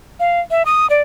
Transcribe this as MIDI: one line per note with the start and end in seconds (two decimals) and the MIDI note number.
0.20 0.40 77
0.51 0.63 76
0.66 0.87 87
0.90 1.02 74